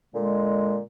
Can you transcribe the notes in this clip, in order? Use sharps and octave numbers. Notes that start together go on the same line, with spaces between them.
A#2 D3 G#3